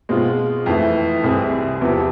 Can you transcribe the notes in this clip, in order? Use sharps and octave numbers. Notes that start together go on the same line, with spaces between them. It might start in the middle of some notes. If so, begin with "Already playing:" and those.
B2 G#3 C4 F4
F2 E3 A3
C2 C3 G#3 C4 G#4
E2 C3 F3 B3